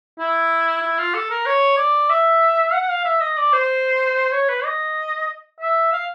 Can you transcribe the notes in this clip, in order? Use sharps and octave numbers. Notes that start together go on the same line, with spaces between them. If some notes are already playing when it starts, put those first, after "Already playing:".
E4
E4
F4
A4
A#4
C#5
D5
E5
F#5
F5
E5
D#5
D5
C5
C#5
B4
D#5
E5
F5